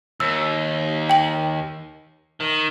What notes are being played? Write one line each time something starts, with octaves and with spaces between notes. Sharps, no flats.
D#2 E6
G5 F#7
D#3